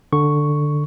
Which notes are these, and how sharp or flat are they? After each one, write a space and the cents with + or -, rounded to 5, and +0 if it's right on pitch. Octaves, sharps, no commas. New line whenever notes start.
D3 +10 C#6 +0